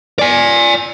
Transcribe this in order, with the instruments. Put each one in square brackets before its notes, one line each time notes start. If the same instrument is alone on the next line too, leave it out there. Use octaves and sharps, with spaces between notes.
[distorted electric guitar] D5 G#5